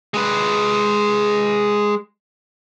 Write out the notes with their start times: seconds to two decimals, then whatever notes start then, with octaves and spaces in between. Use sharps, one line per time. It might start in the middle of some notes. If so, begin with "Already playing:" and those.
0.14 G#3 B4